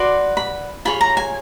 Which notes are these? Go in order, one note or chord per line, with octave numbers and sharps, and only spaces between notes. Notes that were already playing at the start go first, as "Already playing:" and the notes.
Already playing: F#4 B4 D5 C6
B5
F4 G#4 C#5 B5
A#5
G#5